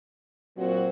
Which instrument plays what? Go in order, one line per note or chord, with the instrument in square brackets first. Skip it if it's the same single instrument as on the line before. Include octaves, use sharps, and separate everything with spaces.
[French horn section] A#2 F#3 C4 F#4